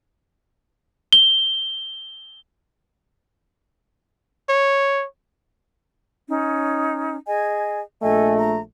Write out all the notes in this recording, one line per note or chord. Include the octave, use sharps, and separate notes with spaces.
G7
C#5
C#4 D#4
G#4 D#5 G#5
A#1 A3 A4 D#5 G#5
A#5